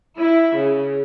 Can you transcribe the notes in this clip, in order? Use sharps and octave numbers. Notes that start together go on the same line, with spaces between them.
E4
C#3